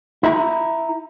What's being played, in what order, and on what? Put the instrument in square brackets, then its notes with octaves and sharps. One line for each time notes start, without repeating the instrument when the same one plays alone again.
[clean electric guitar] E4 E5 A#5